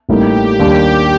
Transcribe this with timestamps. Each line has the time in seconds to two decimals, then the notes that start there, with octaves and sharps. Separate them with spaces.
0.09 A1 A2 G3 A#3 D#4 G4
0.59 D#2 D#3 G3 D4